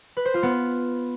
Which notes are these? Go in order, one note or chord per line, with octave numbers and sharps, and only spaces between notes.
B4
C5
F4
B3